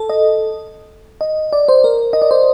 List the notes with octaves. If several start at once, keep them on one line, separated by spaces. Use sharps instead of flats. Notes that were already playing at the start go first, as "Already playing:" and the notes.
Already playing: A4
D#5
D#5
D5
C5
A#4
D#5
D5
C5